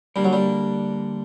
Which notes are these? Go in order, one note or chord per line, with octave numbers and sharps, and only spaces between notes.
D3 G3 A#3 D4 A#4
F#3
G3